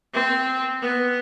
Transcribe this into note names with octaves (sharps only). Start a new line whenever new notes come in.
C4
B3